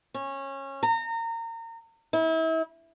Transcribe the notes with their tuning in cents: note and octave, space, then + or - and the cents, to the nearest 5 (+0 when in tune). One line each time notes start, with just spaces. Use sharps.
C#4 -20
A#5 -30
E4 -35